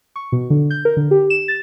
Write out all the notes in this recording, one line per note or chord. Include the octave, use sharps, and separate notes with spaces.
C#6
B2
D3
G6
A#4
D3
G4
E7
A6